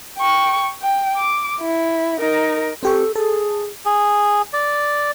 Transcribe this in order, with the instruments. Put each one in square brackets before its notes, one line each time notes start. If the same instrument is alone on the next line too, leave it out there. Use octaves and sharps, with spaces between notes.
[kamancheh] G5 C#6
G5
D6
E4
D#4 A#4
[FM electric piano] C4 G4 C#6 [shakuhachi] A4
[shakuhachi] G#4 [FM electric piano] A4
[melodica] G#4
D5